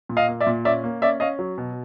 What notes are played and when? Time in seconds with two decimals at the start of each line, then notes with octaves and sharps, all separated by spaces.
0.09 A#2
0.17 D#5 F5
0.28 A#3
0.41 D5 E5
0.47 A#2
0.65 C#4 D5 E5
0.84 A#3
1.02 C#4 D5 E5
1.20 C#4 D#5 F5
1.39 F#3
1.58 B2